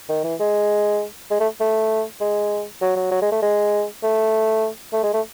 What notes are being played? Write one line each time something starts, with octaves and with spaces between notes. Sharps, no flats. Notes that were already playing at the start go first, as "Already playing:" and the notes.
D#3
E3
G#3
G#3
A3
A3
G#3
F#3
F#3
F#3
G#3
A3
G#3
A3
A3
G#3
A3